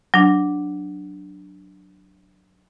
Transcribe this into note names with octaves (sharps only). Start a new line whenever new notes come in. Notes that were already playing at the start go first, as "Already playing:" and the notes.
F#3 D4